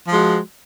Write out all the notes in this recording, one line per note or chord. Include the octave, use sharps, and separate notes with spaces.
F3 G#3 F#4